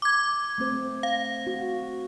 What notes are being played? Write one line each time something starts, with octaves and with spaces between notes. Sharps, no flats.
D6 G#6
A3 C4 C5
F5
F#4